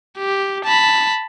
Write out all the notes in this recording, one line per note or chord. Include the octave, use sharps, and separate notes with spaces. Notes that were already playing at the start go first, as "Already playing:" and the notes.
G4
A5 B5